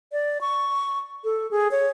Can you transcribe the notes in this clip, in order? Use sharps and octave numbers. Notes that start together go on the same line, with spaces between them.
D5
C#6
A4
G#4
C#5